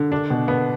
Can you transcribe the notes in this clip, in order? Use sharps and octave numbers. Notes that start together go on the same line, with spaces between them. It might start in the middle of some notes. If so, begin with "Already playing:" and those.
Already playing: D3
D4
B2
B3